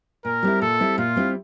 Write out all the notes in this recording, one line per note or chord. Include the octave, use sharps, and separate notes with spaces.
A#2 A#4
G3 C4 E4
A#2 A4
G3 C4 E4
A#2 F4
G3 C4 E4